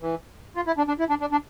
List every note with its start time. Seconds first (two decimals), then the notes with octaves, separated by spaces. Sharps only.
0.02 E3
0.56 F4
0.67 E4
0.78 D4
0.88 D4
0.99 E4
1.10 D4
1.21 D4
1.32 D4